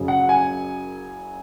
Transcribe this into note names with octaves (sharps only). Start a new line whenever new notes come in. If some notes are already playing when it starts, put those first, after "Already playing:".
Already playing: F#1 F#2 C#3 F#3 C#4
F#5
G#5